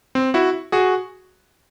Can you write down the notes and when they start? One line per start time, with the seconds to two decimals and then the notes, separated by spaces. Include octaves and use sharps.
0.15 C4
0.34 E4 F#4
0.72 F#4 G#4